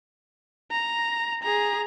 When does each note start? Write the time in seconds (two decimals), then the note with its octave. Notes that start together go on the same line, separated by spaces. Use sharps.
0.71 A#5
1.43 G#4 A#5